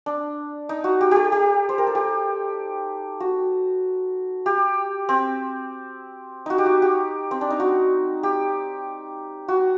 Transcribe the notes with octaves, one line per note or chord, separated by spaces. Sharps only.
D4
D#4
F#4
G4
G4 A4
G4
C5
A#4
A4
G4
F#4
G4
C4
D#4 F#4
G4
F#4
G4
C4
D4
D#4
F#4
G4
F#4